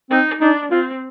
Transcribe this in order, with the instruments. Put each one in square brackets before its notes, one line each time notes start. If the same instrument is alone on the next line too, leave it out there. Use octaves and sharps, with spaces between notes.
[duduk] C4 [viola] D#4
[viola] D4 [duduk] D#4
[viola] C4 [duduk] F4